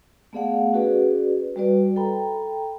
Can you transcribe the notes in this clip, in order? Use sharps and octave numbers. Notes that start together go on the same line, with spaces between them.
A3 B3 G#4 D5 F5 F#5
C#4 F#4 G#4 B4 D5
G3 F#4 B4 D5
A4 G5 A#5 B5